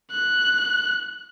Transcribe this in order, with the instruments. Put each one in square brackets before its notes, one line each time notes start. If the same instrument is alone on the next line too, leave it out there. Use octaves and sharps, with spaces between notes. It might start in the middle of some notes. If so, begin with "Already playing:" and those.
[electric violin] F#6